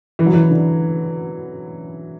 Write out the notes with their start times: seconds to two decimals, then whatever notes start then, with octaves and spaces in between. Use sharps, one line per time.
0.19 E3
0.26 F#3
0.33 E3
0.50 D3